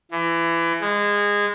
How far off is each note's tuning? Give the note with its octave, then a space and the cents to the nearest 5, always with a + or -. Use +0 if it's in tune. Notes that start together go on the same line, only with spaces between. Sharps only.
E3 +25
G#3 -20